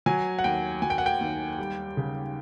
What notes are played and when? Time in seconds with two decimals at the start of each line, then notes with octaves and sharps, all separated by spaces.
0.06 F#3 G#5
0.39 F#5
0.44 D#2 G5
0.82 F#3 G#5
0.90 G5
0.98 F#5
1.06 G5
1.21 D#2
1.58 G3
1.97 C#3